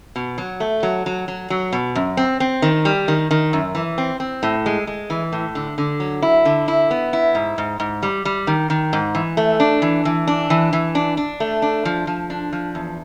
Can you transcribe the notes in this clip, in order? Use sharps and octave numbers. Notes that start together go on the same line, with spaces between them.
B2
F#3
A3
F#3
F#3
F#3
F#3
B2
F#2
C4
C4
D#3
G3
D#3
D#3
F#2
E3
C4
C4
A2
G#3
G#3
E3
A2
D3
D3
F#3
E4
D3
E4
B3
E4
G#2
G#2
G#2
G3
G3
D#3
D#3
G#2
E3
A3
D4
E3
E3
D4
E3
E3
D4
D4
A3
D4
F3
F3
D4
F3
E2